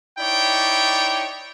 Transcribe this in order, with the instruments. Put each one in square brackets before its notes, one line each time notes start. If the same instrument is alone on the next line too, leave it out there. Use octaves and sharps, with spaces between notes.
[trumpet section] D#4 E4 C#5 D5 G5